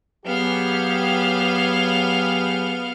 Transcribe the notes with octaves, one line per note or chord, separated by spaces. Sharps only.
F#3 B3 G4 G#4 F5